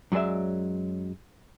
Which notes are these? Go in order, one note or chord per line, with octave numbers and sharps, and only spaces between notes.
F#2 F#3 G#3 D5 E5